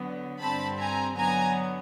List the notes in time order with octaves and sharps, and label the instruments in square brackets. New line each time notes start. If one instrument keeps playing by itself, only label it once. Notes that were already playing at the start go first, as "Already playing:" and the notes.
Already playing: [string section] D3 F#3 B3
G2 D3 G3 C4 A5 B5
G#5 A#5
D3 F#3 B3 G#5 A#5